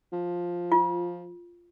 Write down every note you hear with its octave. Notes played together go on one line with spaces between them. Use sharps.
F3
F4